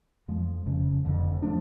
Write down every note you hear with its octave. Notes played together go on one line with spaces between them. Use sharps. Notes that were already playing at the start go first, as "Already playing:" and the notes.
F2 F3 G#3
F1 F2 C#3 F3
F1 F2 D3
F3 A3 D4